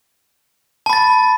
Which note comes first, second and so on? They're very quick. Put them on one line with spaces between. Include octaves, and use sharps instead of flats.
A5 B5 A6